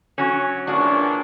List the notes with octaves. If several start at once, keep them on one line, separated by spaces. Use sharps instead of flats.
F#3 C#4
A#2 E3 D4 F#4 G#4 A#4